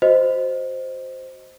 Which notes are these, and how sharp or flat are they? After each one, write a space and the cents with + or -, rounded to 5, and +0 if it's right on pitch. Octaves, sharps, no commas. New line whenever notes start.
F#4 +0 C5 -5 D#5 +0